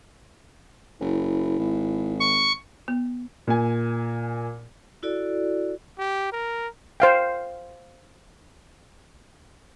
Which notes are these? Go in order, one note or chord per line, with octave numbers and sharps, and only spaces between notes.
F#1 E4
G#1
C#6
B3
A#2 G#5
E4 F#4 A4 D5
G4
A#4
C5 F5 G5